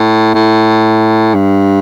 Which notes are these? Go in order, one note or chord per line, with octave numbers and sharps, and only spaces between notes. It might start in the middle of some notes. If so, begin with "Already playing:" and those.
Already playing: A2
A2
G2